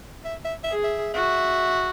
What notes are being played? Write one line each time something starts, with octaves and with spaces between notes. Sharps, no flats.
E5
E5
E5
G#4
E5
F#4 E5